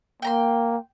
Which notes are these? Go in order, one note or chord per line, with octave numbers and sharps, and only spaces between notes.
A#3 G5 A#5 C6